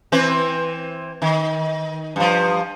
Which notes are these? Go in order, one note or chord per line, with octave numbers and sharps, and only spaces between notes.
E3 C4 B4
D#3
G2 F3